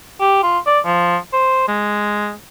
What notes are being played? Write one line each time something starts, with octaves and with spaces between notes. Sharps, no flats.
G4
F4
D5
F3
C5
G#3